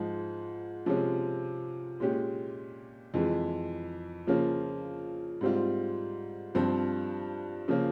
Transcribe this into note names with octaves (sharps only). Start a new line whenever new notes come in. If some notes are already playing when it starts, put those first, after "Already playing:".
Already playing: G#2 F3 G#3
C3 F3 G#3 C#4
A#2 G#3 C#4 G4
F2 E3 G#3
C#3 F3 A#3 C#4 F4
G#2 G3 C4 F4
G2 F3 C4
C#3 F3 A#3 C#4